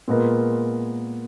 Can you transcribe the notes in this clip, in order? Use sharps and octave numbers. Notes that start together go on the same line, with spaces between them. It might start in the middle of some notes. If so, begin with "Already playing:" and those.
A#2 G#3 B3 F4 A#4